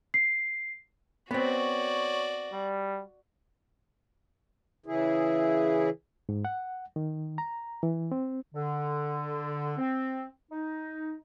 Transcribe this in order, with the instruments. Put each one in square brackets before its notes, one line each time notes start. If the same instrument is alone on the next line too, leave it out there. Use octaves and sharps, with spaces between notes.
[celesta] C7
[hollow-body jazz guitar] B3 C4 [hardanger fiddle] F#4 D5 [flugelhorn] C#5
[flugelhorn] G3
[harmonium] C#3 E3 E4 G#4
[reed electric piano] G#2
F#5
D#3
A#5
E3
C4
[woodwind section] D3
C4
D#4